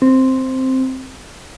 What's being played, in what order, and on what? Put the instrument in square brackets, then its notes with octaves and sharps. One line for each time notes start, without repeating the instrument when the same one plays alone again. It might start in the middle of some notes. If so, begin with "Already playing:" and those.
[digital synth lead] C4